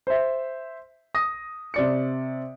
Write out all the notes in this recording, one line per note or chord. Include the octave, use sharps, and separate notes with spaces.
C5 E5
D#6 A#6
C3 D5 C#7